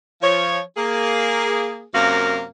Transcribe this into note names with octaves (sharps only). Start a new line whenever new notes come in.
F3 C#5
A#3 G#4
F#2 C3 A#3 F#4 A#4 F5